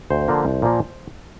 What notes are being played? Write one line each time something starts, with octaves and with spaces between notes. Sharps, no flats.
D2 C5
D3 F3 A#3
C2
A#2 F3 A#3